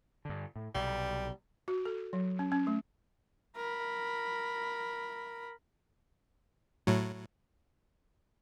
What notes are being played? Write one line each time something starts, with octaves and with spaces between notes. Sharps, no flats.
G2 D3
A2
B1 C3 G3
F#4
A4
F#3
C#4
C#4
A3
A#4 B5
A2 F#3